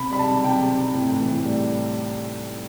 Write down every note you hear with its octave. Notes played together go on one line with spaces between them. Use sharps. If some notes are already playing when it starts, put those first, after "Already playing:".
Already playing: C3 B5
G3 B5
A5
C3
C3 G5
C3
C3
A2
E3
A2
G3